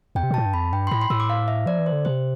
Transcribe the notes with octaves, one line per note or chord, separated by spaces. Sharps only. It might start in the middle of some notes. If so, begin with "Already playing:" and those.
E2 G5
C3
B2
A2 A5
G2
F2 B5
G2 G5
C6
A2 B5
C6
A2 E6
D6
F5
E5
F3 D5
E3
C5
D3
C3 C5